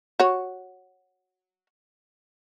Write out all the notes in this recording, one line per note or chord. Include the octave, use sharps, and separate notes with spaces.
F#4 C#5